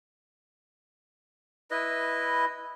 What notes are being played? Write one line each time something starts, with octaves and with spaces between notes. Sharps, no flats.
E4 B4 D#5